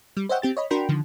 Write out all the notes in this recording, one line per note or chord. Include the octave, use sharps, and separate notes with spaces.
G3
C5 C#5 D#5 E5 F#5 G5
C4 G4 A6
C#5 D#5 B5
D4 F#4 A#4 G5 B5 C6
D3 D#3 F3